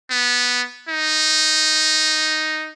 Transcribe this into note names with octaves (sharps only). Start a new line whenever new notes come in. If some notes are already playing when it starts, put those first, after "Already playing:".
B3
D#4